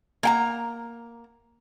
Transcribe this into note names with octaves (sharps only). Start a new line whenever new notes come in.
A#3 G5 A#5